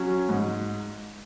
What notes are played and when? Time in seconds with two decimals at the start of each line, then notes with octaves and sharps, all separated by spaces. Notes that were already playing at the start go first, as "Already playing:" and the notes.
Already playing: F#3 C#4
0.29 G#2